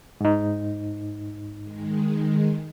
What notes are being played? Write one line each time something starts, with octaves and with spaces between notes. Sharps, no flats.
G#2 D#4
D#3 G#3